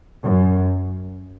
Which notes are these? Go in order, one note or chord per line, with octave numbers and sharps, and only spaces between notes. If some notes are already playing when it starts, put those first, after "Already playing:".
F#2